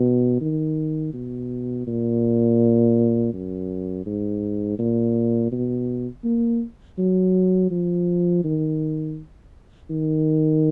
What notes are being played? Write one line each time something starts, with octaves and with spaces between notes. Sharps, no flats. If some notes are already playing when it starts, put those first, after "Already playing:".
Already playing: B2
D#3
B2
A#2
F#2
G#2
A#2
B2
A#3
F#3
F3
D#3
D#3